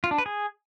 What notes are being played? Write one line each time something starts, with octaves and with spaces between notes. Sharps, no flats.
F4
D4
B4
G#4